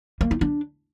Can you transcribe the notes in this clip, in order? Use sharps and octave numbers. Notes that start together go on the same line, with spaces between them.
A#3
D#4
D4